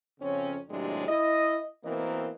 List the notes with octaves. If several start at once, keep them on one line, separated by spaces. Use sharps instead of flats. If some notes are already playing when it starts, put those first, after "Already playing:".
F2 C#3 C4 C#4
D#2 A2 C3 F#3 G#3 D4
E4 D#5
B2 E3 A#3 C4 A#4 D#5